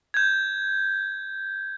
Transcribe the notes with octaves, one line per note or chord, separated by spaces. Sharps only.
G6 G#6